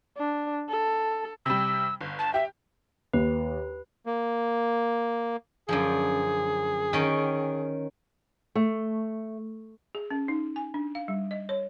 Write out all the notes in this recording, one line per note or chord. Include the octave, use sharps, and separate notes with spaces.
D4
A4
C3 G3 E6
G1
A5
G4 E5
D#2 B4
A#3
F#2 D3 F3 G#4
D#3 C#4 G5
A3
G#4
C#4
D#4
G#5
D4
F5
G3
D#5
C#5